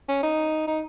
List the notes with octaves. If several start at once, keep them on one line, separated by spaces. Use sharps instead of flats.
C#4
D#4
D#4